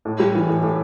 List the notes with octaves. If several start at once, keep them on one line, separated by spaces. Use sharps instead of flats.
A2
G3
E3
A2
A2